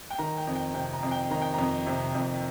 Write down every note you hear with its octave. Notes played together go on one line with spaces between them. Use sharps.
G5
D#3 A#5
G5
F2
G5
C3 G5
A#5
F2
G5
D#3 A#5
G5
F2 A#5
C3
F2